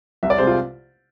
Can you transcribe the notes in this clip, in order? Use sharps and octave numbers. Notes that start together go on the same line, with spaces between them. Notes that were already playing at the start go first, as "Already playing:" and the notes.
C2 E5
D5
C3 G#3 C5
F4